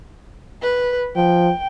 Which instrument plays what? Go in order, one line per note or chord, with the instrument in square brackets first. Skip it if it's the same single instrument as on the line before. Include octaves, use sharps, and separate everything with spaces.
[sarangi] B4
[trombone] F3 [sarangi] G5